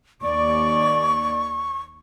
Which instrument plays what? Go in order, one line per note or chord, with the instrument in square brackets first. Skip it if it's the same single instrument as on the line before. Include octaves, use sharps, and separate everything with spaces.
[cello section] D#2 D5 [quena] C#6